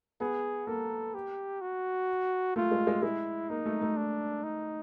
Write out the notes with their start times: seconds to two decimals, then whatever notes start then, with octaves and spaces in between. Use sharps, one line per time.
0.20 B3 G#4
0.67 A#3 A4
1.15 G4
1.61 F#4
2.56 A3 F4
2.71 G#3
2.87 G#3
3.03 G#3 E4
3.49 A#3 D#4
3.66 A3
3.82 A3
3.97 D4
4.43 D#4